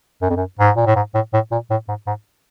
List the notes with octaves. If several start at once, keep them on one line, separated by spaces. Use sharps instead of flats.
F#2
F2
F#2
G#2
A#2
A2
G#2
A2
A2
A#2
A2
G#2
G#2